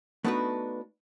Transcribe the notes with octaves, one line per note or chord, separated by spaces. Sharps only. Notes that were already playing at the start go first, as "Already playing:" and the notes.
A3 B3 D4 D#4 F#4 B4